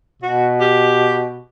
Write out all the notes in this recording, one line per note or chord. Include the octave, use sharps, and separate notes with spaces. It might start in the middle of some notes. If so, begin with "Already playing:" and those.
B2 F#4
G4